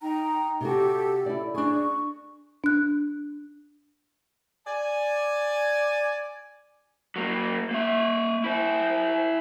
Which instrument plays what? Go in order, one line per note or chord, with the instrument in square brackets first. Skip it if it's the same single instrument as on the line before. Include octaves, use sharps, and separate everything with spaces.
[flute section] D#4 G5 A#5
[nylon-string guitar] C3 F#4 [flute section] G4 A4
[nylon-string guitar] E4 D5
[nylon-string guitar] D4 G#4 [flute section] C#6
[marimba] D4 F#6
[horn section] D5 G#5
[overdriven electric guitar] F#3 A#3
A#3 E5
E4 C5